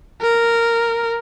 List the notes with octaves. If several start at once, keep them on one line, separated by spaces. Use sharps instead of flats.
A#4